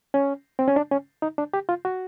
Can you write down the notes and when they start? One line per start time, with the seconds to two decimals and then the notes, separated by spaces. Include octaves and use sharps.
0.14 C#4
0.59 C4
0.68 C#4
0.76 D4
0.92 C#4
1.22 D#4
1.38 D4
1.54 G4
1.69 F4
1.85 F#4